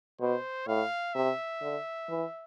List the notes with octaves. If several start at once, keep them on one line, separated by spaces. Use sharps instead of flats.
B2 C5
A2 F5
C3 E5
D3
E3